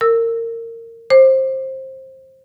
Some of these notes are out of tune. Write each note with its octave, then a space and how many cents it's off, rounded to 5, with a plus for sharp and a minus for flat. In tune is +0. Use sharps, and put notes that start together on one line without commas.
A#4 -25 E6 +0
C5 +20 D6 +30